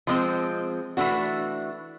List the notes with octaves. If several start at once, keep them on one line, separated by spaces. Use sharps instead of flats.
F3 G#3 C4
E3 A3 D4 F#4